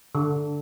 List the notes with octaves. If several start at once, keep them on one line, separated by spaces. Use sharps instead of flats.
D3